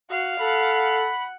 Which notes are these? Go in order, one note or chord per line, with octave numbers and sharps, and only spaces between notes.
F#4 F5
A4 F#5 B5